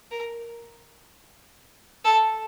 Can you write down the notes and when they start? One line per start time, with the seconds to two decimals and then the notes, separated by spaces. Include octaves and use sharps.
0.11 A#4
2.05 A4